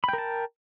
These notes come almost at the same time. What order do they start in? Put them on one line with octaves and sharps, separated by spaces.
B5 G5 A#4 A5